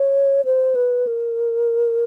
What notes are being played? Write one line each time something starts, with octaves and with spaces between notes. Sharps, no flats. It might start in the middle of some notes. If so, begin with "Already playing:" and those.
Already playing: C#5
C5
B4
A#4